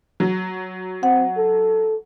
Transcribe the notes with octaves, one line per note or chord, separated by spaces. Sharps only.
F#3
C4 F#5
A4